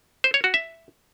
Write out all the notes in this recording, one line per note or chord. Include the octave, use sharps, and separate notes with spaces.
C5
C#5
F#4
E5